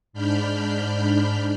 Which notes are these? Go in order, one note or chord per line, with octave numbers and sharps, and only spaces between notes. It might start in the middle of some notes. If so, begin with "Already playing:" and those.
G#2 D4 B5 F6 G6